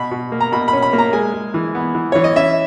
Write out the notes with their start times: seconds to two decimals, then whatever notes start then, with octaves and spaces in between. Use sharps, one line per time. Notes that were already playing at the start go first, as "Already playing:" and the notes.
Already playing: B2 B5
0.11 B2
0.32 A#3
0.41 A#5
0.52 B2 B5
0.68 B5
0.73 C#4
0.82 B5
0.93 A#3
0.98 A#5
1.13 G#3 G#5
1.34 G#3
1.54 E3
1.75 B3
1.95 E3
2.12 E3 C#5
2.24 D#5
2.36 C#4 E5